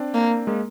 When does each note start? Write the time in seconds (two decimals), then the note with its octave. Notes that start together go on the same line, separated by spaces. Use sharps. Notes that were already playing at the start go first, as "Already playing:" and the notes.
Already playing: C4 D4
0.14 A#3
0.47 G#3 A#3